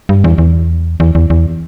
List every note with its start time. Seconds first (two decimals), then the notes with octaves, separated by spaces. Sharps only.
0.09 G2
0.24 E2
0.38 E2
1.00 E2
1.15 E2
1.30 E2